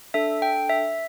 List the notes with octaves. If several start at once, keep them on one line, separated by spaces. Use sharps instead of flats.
D4 A4 E5
G5
E5